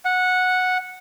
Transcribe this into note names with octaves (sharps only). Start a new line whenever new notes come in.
F#5